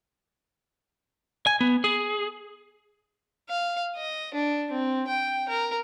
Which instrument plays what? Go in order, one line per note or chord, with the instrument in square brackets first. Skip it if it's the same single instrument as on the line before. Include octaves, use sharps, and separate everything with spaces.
[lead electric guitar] G#5
B3
G#4
[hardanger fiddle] F5
D#5
D4
C4
G5
A#4